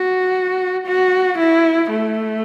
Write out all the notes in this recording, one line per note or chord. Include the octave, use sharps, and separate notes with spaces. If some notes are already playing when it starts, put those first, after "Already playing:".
Already playing: F#4
F#4
E4
A3